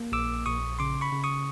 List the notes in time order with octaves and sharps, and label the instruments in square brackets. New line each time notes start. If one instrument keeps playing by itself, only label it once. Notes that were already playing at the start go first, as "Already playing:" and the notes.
Already playing: [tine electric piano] A#3
A#1 D6 E6
A#1 C#6 D#6
C#3 C6 D6
B5 C#6
C#3
C#6 D#6